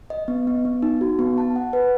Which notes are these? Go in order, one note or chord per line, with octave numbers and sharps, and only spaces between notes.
D#5
B3
B3
B3
D#4
F#4
B3
A5
F#5
B4